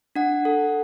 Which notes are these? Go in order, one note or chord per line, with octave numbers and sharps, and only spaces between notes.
D4 F#5
A4